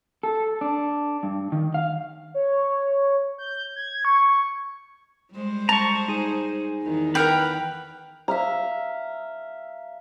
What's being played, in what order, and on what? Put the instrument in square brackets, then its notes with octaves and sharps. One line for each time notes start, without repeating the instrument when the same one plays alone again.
[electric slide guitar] A4
D4
G2
D#3
F5
[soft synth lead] C#5
G6
G#6
C#6
[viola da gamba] G3 G#3 C5
[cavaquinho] A5 [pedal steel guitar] A#5 C#6
[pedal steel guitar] D#4 G#4
[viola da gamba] E2 D#3
[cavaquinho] A#4 F#5 G5 [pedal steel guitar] B4 F6
[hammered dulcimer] E5 F5 A#5